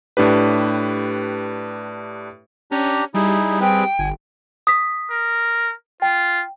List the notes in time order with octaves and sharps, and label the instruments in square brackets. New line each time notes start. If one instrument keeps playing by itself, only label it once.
[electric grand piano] A2 D4 G4 B4
[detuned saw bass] C#4 [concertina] D4 G4 A#5
[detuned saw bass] G3 [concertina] D#4 E4 G#4
[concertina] C4 G#4 B4 [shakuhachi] G5
[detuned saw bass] G1 [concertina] G#5
[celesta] D#6 B6
[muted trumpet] A#4
[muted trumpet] F4 [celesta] G5